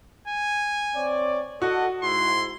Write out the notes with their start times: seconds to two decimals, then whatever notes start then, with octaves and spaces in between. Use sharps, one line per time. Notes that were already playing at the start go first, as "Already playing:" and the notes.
0.27 G#5
0.95 C4 C#5 D5
1.62 F#4 A4 D#5 F#5
2.03 G#2 E4 C6